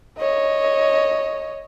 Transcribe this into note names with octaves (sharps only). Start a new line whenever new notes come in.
C#5 D#5